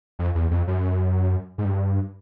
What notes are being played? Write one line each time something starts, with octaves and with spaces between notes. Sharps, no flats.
F2
E2
F2
F#2
G#2
G2